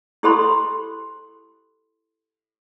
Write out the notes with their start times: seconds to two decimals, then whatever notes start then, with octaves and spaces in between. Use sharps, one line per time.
0.23 E4 G4 A4 C5 B5 C6